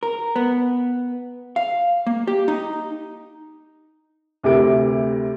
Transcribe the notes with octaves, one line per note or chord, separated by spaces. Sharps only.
A#4
B3
F5
A#3
G4
D#4
D2 C3 E4 G4 A#4 D7